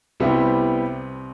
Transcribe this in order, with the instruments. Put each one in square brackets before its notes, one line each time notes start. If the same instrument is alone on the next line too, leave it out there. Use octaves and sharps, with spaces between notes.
[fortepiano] C2 C3 [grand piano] G3 B3 E4 G4